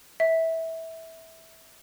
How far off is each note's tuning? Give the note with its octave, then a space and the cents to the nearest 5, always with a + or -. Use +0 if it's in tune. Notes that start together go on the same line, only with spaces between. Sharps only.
E5 -20